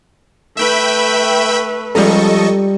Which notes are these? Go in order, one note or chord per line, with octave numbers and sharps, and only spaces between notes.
A3 B4 E5 G5 B5
F3 G3 G#3 C#4 A4 D#5 A#5 C#6